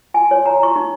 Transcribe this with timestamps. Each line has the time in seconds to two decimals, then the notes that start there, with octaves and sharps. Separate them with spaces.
0.14 G#5
0.31 C#5
0.46 A#5
0.63 C#6
0.76 D#4